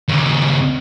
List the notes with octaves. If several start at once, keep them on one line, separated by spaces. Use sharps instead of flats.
D#2 C#3